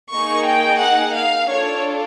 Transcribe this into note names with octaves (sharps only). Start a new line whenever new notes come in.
A#3 D#4 G#4 C#6
G5
F#5
F5
D4 F4 A4 C#5